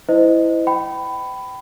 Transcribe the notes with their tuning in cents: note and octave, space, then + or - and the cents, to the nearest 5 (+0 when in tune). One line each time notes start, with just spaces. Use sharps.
E4 +0 C5 -35 D#5 +0
G5 -25 B5 +15